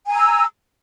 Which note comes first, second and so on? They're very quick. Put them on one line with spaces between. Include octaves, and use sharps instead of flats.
G#5 A#5 E6